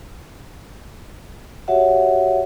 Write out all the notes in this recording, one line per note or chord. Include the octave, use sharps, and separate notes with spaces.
F#4 G4 C#5 E5 F#5